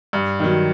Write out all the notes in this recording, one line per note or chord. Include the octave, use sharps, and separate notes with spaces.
G2
D#3 F#3